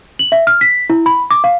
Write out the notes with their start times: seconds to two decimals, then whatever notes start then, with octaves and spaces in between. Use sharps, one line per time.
0.19 F#7
0.32 E5
0.47 F6
0.61 B6
0.90 E4
1.06 B5
1.31 D6
1.44 F5